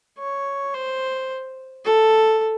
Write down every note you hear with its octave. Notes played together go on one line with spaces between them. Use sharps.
C#5
C5
A4